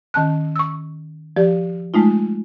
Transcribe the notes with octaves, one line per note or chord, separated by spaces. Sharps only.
D#3 C#4 A5 F#6
C#6 E6
F3 G4 D5
G#3 A3 D#4 F4